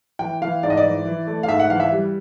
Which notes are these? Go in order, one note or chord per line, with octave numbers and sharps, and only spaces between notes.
E3 G5
E3 F5
G#2 D5
D#5
D5
E3
E3
A3
F5
G#2 E5
F#5
E3 F5
E5
G3